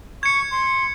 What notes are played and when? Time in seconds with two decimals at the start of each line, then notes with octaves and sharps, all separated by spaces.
0.23 C#6 G#6 C#7
0.51 C6